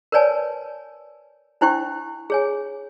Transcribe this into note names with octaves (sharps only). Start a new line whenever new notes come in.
A#4 B4 C#5 D5 G#5 A5
D4 E4 C5 G5 C#6
G#4 C#5 G#5